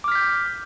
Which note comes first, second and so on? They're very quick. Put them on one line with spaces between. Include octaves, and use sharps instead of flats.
D6 F6 B6 G6